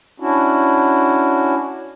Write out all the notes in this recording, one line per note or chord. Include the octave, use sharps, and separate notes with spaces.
C#4 D4 E4 F#4